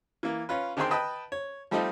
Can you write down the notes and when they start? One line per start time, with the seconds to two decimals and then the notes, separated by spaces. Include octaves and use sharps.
0.23 E3 A#3
0.49 C#4 F4 B4
0.77 D3 D#3 C4 G#4 G5 C6
0.91 B4 D#5 G5 A5 B5
1.32 C#5
1.71 F3 G3 A3 C4 D#4 F4